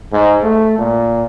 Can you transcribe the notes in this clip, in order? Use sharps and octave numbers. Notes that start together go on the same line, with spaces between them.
G#2
A3
A#2